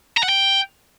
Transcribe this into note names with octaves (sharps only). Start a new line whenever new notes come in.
A#5
F#5
G5